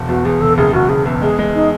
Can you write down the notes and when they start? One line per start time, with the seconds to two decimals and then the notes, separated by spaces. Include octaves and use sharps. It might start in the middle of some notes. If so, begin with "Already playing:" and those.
Already playing: E1
0.08 E2 F#4
0.25 E2 G#4
0.40 E1 A4
0.57 F#1 G#4
0.73 F#1 F#4
0.89 F#1 G#4
1.05 E2
1.21 G#3 G#4
1.39 G#3
1.55 D#4